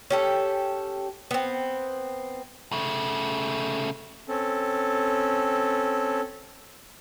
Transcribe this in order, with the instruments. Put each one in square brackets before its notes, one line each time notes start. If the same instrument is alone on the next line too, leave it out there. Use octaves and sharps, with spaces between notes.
[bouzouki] C#4 G4 A4
B3 C4
[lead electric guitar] C#3 A3
[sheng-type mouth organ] C4 C#4 A4